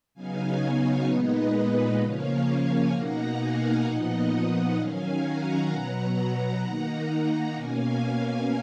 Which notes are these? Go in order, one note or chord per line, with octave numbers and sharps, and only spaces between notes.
C#3 F#3 B3 D#4 F5 G#5
C#5 F5
A#2 G#3 B3 D#4 B4 D#5
B4 D#5
C#3 F3 A#3 C#4 C#5 F5
F5 G#5
B2 A#3 D#4 F#5 A#5
F5 G#5
A#2 F3 B3 D#4 D#5 F#5
D#3 F#3 C#4 F5 G#5
F#5 A#5
B2 F#3 B3
D#3 A#3 D#4 F#5 A#5
B2 A#3 C#4 F5 G#5